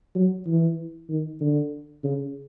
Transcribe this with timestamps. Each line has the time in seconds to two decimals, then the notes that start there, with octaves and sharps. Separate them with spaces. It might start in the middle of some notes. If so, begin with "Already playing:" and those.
0.15 F#3
0.47 E3
1.10 D#3
1.40 D3
2.04 C#3